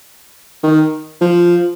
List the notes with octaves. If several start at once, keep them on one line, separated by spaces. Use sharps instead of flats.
D#3
F3